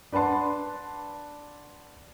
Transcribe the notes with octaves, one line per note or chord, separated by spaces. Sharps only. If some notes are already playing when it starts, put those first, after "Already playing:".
D4 B4 F#5 A5 C6